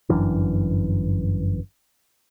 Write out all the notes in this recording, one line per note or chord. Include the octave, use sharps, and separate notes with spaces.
G1 F#2 E3 D4